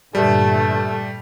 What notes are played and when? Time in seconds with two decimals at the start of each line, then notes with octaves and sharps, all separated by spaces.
0.15 G2 A#2 D3 G3 A3